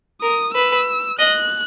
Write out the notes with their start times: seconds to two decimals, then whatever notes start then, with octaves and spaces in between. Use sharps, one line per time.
0.22 A#4 D#6
0.54 B4 E6
1.19 D#5 F#6